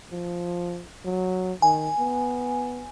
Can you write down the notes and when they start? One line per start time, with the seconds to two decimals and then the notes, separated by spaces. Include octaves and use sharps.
0.12 F3
1.05 F#3
1.62 D#3 G#5
1.99 B3